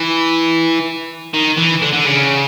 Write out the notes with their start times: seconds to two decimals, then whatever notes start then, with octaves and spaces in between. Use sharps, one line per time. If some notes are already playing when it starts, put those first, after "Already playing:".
Already playing: E3
1.34 D#3
1.57 E3
1.82 D3
1.93 D3
2.05 C#3